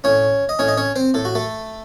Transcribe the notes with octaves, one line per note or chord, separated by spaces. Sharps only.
A2 C#4 C#5
D#5
A2 C#4 C#5
D#5
C#4 C#5
C4 C5
A2 A4
F#4
A3 A4